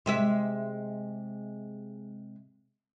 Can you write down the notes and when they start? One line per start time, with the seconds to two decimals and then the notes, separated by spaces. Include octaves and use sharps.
0.06 C3 G#3 E5